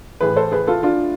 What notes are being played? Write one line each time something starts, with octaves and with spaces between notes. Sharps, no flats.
A2 E3 A3 G#4 B4
A4 C5
G#4 B4
F4 A4
D4 F4